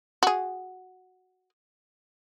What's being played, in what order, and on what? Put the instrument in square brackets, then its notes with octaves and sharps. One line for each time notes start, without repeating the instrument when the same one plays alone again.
[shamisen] F#4 G#4